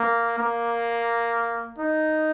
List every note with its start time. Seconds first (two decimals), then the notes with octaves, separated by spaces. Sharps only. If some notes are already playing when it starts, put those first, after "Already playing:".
Already playing: A#3
0.38 A#3
1.78 D#4